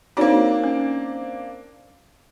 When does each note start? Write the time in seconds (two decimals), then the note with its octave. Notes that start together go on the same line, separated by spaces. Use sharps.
0.17 A#3 C4 D4 D#4 F#4 C#5
0.64 C#4